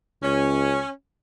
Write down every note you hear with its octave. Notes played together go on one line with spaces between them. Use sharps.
C#2 C#4